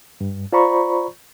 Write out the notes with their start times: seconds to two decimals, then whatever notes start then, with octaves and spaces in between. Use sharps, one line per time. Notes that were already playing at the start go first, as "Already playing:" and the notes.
0.21 G2
0.52 F4 C5 D5 A#5 B5 C#6